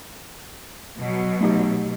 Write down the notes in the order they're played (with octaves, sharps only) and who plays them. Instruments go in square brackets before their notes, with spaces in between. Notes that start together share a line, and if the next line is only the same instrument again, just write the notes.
[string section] B2 F#3
[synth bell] A3 D#4 G4